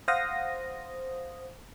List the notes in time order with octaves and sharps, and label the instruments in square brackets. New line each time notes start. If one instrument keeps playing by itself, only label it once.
[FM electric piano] C5 F5 F#5 D#6 A#6